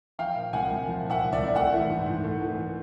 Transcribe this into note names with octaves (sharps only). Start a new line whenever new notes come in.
F3 F5 G5
A#2
C2 F#5 G#5
C2
F3
A#2
E5 F#5
C2
D5 E5
C2
A3 E5 F#5
E3
G#2
G#2
A3
E3